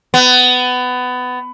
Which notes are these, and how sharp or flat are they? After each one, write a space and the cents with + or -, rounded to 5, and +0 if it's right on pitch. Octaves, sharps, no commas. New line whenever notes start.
B3 +20